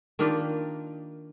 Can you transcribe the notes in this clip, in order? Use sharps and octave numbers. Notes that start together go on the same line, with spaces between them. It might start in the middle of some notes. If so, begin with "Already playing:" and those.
D#3 A#3 D4 F4 G4